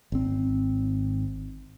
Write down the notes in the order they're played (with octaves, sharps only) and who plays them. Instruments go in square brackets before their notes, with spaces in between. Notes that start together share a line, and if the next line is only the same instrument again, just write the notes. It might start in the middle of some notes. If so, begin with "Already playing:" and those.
[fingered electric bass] G#1 C4